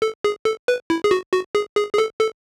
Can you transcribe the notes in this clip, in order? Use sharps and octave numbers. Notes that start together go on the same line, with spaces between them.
A4
G#4
A4
B4
E4
G#4
F#4
F#4
G#4
G#4
G#4
A4
A4